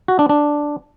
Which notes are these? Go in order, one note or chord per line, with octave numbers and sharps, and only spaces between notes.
F#4
D4
D4